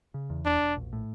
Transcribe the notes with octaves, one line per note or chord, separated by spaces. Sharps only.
C#3
E2
E1 D4
E1
A#1
A2